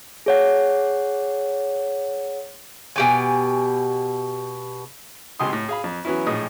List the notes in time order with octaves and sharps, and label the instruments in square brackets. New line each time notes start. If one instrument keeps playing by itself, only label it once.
[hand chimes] G#4 C#5 F#5
[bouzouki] B2 G4 G#5
[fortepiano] G#1 C#2 G#3 G4 C6 D#6
A2
G#4 F5 B5
F2
E3 F#3 B3 C#4 E4
A#1 A2 G#4 D#5 D#6